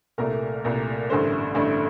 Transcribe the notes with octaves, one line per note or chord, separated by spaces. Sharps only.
C2 A#2 A3 A#4
C2 A#2 A3
A1 G2 D3 A3 C5
A1 G2 D3 A3